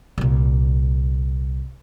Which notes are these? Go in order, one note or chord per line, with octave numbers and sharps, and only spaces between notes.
C2 A#2